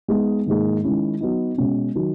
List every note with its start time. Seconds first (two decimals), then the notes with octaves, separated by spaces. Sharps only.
0.08 G#3 B3 D#4 G#4
0.46 G#2 D#3 A#3 D#4 G#4
0.83 D#3 G#3 C#4 E4
1.21 F#3 B3 D#4
1.58 B2 G#3 C#4
1.95 D#3 F#3